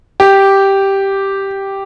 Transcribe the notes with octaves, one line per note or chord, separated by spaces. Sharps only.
G4